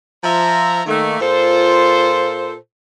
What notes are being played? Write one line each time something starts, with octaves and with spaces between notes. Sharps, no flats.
F3 E5 A#5
D#3 A3 A#3
A#2 F4 A4 C5